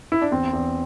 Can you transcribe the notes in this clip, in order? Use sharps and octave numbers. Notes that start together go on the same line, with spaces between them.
E4
D4
E2 C4
E2